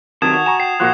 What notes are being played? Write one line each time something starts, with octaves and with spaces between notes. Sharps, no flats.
C3 D#3 F#3 A5 D#6 G#6 E7
F#4
G#5 A#5 C#6 E7
G5 C7 E7
A#2 F3 A#3 F#4 C6 F#6